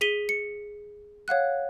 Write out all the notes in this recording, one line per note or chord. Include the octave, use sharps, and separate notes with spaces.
G#4 B6 D#7 G7
C#7
C#5 F5 F#5 F#6